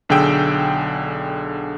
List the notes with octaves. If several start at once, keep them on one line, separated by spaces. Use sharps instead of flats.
B1 D3 G#4 G5 E6